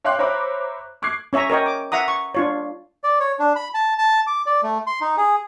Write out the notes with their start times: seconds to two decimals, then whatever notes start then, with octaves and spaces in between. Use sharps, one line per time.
0.04 C#5 F5 G5 C6 D6 F#6
0.19 C5 C#5 E5 A#5 B5 D6
1.02 C#6 D6 F#6 G#6 C7
1.33 C#4 C#5 E5 G#5 A#5
1.50 A#4 C#5 D#5 G5
1.66 D6
1.92 E5 F#5 A#5 D#6
2.08 C#6
2.35 D4 F4 C#5
3.04 D5
3.20 C#5
3.39 D4
3.56 B5
3.74 A5
3.98 A5
4.27 D6
4.46 D5
4.63 A3
4.87 C6
5.01 D#4
5.17 G#4